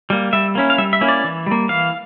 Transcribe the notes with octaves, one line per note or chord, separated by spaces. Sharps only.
G3 A#3
G3 E5
A#3 C#4 E4
F5
G3 E5
E5
A#3 C#4 E4
D5
E3
G3 A#3
E3 F5